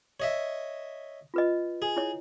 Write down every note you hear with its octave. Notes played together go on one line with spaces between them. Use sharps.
C#5 D#5 E5
F4 B4 D#5
G#4
E4 C#5